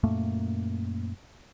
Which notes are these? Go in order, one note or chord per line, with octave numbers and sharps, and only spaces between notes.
F#2 A#2 A3 A#3